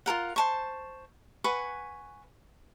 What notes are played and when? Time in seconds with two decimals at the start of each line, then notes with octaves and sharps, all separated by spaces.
0.06 F4 A4 A#4 F#5
0.36 C5 A5 C#6
1.44 B4 F#5 G#5 C#6